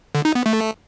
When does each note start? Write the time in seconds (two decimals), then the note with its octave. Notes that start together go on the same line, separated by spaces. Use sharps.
0.15 D3
0.25 D#4
0.35 B3
0.46 A3